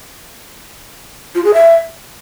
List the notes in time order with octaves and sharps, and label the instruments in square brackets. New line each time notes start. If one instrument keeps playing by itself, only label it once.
[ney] F4
G#4
E5